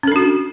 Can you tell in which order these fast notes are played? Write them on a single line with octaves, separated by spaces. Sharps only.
C#4 A4 D4 F#4